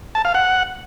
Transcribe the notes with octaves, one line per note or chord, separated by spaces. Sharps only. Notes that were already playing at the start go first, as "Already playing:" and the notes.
A5
F5
F#5